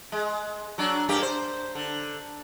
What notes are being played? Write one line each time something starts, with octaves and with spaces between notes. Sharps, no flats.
G#3
F#3 D4
G2 A#3 G4
C5
D3